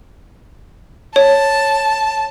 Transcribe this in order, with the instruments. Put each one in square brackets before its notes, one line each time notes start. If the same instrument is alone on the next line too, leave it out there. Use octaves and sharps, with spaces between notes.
[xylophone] C#5 [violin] A5